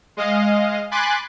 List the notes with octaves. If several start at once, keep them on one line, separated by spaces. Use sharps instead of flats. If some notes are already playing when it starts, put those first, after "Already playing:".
G#3 D#5 F5
G#5 B5 C6 D6 F#6 A6